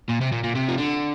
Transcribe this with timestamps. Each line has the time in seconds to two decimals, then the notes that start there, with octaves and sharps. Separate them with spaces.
0.09 A#2
0.21 C3
0.32 A#2
0.44 A#2
0.55 C3
0.69 F3
0.78 D3